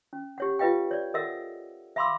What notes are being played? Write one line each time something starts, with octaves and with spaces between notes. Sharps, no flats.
C#4
G4 C#5 F#5
F4 G4 B4 D#5 F5 G5
C#5 D5
A4 A#4 D#5 E5 F#5 E6
E5 F5 B5 C6 D6 E6